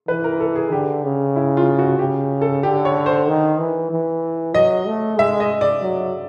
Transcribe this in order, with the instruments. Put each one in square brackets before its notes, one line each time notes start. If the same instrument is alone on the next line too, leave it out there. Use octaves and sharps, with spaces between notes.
[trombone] E3 [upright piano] B4
[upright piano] A#4
A4
G#4
[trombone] D3 [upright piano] G4
[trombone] C#3
[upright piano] E4
F4
F#4
[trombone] C#3 [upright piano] G4
[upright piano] A4
[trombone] D3 [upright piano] G4
[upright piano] C#5
C5
[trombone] D#3
E3
E3
[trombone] F#3 [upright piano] D#5
[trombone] A3
[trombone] G#3 [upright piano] E5
[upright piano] D#5
D5
[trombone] F#3